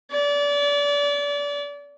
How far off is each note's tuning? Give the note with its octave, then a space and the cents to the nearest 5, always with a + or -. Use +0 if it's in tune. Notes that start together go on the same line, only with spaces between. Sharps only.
D5 -30